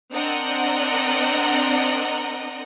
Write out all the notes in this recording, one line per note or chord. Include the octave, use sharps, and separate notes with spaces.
C4 D4 A#4 D#5 F#5